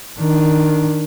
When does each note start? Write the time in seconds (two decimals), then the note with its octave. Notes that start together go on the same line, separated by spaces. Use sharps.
0.20 D#3 D4